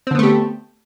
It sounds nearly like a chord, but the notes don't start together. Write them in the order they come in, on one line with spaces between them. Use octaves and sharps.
C4 D3 B3 A3 G4